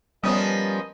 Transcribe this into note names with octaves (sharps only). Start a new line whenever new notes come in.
F3 G3 B3 C#4 A#4 D#5 D#6